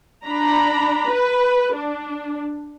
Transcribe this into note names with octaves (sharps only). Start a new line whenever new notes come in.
D4 A#5 B5
B4
D4